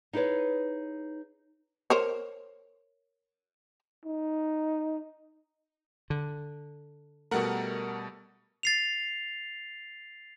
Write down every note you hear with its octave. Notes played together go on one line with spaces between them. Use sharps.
D#4 E4 G#4 B4 C#5
A#4 C5 C#5
D#4
D3
B2 G3 A3 A#4 F#5
A6 C7 F7